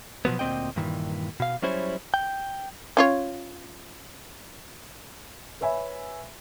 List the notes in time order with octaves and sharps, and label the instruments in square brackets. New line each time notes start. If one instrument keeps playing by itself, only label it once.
[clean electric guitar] B2 F3 F#3 B3
D2 A#2 C4 D#5 G5
G2 A#2 D#3 E3
B2 F5
F#3 G3 C#4 E4 C5 C#5
G5
[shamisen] C#4 F4 C#5
[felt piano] B4 C#5 E5 G#5 B5